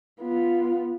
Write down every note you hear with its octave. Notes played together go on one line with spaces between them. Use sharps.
B3 F4